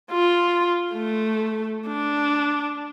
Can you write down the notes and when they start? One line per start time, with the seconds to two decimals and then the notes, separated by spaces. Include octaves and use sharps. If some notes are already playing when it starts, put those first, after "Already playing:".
0.11 F4
0.93 A3
1.88 D4